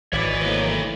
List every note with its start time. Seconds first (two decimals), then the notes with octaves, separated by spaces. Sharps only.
0.13 G#1 E4 B4 C#5 D5
0.43 E3 A3 A#3 D#4 B4